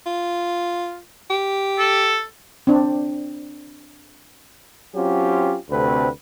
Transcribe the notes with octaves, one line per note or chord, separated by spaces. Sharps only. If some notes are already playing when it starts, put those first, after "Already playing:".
F4
G4
A4
C4 D4
F#3 C4 C#4 F4 G4
D2 C3 A3 C4 B4